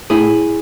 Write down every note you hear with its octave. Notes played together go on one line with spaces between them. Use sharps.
A2 E4 G#4